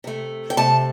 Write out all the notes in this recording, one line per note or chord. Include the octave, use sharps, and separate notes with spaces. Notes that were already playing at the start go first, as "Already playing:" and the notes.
C3 A3
G5
C3 A3 A5